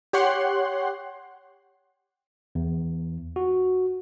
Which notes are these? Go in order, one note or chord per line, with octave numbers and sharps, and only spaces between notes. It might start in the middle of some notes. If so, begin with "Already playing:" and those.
G4 C#5 F#5 C6 F#6
E2
F#4